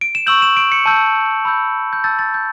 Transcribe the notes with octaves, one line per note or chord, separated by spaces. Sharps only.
D7
E7
C#6 E6 G6 F#7
E7
D7
C#7
A5 E6 G6
B5 E6 G6
G6
A5 E6 G6 A6
A6
G6